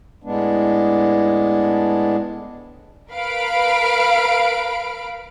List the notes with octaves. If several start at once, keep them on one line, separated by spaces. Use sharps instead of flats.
A2 G#3 B3 D4
A#4 B4 F5 B5 D7